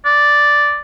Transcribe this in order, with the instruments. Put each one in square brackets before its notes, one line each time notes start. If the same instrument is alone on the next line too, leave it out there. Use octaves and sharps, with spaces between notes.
[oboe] D5